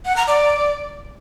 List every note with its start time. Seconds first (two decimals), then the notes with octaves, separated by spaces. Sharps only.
0.05 F#5
0.16 A#5
0.27 D5